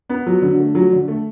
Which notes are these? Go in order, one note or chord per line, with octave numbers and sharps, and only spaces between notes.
B3
F#3
D3
A3
F#3
D3
A3